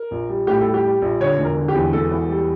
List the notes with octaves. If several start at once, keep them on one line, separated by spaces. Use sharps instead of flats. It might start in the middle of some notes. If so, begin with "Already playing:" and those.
Already playing: A#4
A#1
G3
A2 G4
G3 A4
G4
G3
A#1
D3 C#5
E1
A#4
D3
G4
E2
E1 A4
E2
G3